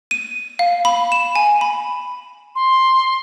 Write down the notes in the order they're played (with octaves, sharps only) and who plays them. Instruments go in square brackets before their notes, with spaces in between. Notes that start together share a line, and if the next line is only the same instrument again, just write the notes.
[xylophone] D#7
F5
B5
E7
G#5
B5
[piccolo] C6